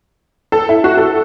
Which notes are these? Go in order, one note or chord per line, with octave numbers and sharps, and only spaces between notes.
A4
E4
F#4
A4